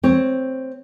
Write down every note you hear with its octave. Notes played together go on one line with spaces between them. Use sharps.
C4 C#5